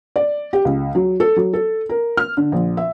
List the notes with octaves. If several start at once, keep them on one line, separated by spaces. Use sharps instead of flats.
D5
G4
C#2
F#3
A4
F#3
A4
A#4
F6
D3
A#1
E5